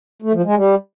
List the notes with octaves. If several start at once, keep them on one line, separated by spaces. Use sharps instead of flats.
A3
F3
G#3
G3